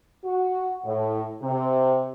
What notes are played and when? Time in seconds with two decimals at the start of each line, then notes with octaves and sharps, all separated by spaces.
0.25 F#4
0.86 A2
1.43 C3